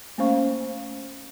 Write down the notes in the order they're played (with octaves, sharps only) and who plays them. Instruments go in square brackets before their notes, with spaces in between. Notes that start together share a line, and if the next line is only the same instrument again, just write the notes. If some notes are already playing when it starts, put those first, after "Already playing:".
[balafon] A3 A#3 C#4 C5 F5 C#6